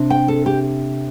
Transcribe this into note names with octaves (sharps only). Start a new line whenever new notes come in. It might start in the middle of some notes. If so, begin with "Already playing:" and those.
Already playing: C3 D4
G5
A4
G4